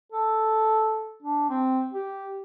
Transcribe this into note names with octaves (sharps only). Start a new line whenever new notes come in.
A4
D4
C4
G4